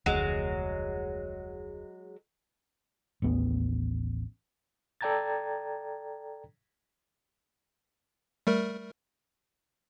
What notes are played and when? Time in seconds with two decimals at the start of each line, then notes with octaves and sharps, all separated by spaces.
0.06 F1 D2 F#3 G#3
3.22 A1 D#2 B3
5.01 A4 D5 G5 A#5 G#6 A6
8.47 G3 A3 A#4